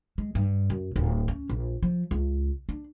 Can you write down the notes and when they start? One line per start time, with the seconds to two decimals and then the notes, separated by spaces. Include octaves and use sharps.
0.18 G#3
0.35 G2
0.70 F#2
0.96 D1
1.28 C#4
1.49 A#1
1.82 F3
2.11 C#2
2.69 D4